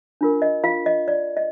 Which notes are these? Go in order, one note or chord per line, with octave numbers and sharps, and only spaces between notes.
D4 F4 A#4
D#5
F4 F5
D#5
D5
D#5